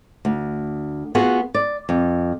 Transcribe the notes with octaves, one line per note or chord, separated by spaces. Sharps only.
D2
B3 F4 F#4 G#4
D5
F2